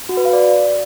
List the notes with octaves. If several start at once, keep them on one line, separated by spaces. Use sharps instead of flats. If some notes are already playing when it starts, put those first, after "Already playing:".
F#4
B4
F5
D5